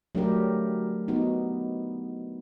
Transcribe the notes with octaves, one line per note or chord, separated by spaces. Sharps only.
F#3 A3 D4 G4 A#4
B3 D#4 F#4